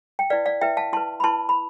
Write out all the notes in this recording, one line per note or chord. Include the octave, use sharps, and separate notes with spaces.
G5
E4 B4 D5 F5
D5 F5
E4 B4 E5 G5
F5 A5
E4 B4 A5 C6
B5
E4 B4 A5 C6
B5